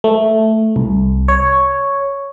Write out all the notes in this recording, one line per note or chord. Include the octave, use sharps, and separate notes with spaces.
A3
C2
C#5